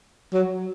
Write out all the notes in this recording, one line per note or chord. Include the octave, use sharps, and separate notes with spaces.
F#3